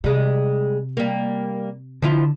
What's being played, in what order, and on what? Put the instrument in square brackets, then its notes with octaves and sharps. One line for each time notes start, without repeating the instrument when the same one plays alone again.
[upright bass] C3 [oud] G3 G#3
[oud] G3 A#3
[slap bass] D3 [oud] F3 E4 F4